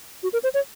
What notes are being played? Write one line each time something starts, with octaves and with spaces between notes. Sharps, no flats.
F#4
A#4
C5
C#5